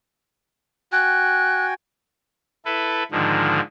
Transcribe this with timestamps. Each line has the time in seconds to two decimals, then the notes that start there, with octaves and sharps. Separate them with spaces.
0.92 F#4 G5 G#5 F#6
2.65 E4 A4 B4
3.12 G#2 D3 D#3 F3